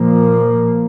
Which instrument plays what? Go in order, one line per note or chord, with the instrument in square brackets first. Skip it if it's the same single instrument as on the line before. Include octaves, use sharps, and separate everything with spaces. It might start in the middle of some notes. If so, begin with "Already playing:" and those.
Already playing: [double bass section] A#2 F3 A#3